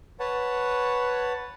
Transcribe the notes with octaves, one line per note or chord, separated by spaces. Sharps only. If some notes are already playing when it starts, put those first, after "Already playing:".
B4 C#5 F#5 A5